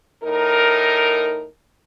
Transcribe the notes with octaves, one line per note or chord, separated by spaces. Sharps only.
A2 D#4 A#4